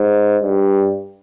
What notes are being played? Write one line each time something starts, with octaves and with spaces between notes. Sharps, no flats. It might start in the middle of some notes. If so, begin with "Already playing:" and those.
Already playing: G#2
G2